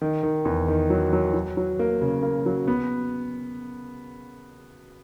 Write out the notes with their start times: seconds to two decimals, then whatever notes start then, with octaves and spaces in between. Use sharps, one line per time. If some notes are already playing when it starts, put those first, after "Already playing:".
0.02 D#3
0.23 D#3
0.45 E2
0.68 D#3
0.90 F#3
1.13 F#3
1.34 F#3
1.57 F#3
1.79 A#3
2.01 C#3
2.23 A#3
2.46 F#3
2.67 B3